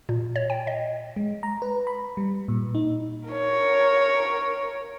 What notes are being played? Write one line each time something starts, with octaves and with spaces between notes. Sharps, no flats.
A#2
C#5
G5
D#5
G#3
A#5
B4
B5
G3
A#2
D#4
A#4 C#5